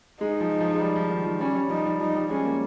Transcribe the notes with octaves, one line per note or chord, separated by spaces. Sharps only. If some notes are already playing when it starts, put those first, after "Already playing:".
G#3 D#4
F3
F3
G#3
G3
F3
D#3
F3
G3 C#4
G3
F3 D#4
G3
F3 D#4
G3
G#3 C#4
A#3